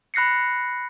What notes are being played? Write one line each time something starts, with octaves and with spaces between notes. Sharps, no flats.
B5 F#6 A#6 C7 C#7